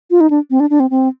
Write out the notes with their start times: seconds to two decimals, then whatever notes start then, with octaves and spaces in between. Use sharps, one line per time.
0.11 F4
0.21 D#4
0.30 D4
0.50 C4
0.60 D4
0.70 D4
0.80 C4
0.90 C4